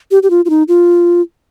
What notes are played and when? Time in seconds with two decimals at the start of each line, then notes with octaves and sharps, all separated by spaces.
0.11 G4
0.23 G4
0.30 F4
0.45 F4
0.50 D#4
0.68 F4